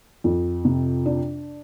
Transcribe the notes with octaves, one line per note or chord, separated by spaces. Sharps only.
F2
C3
D4